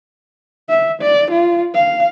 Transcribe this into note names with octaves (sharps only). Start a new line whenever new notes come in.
E5
D5
F4
F5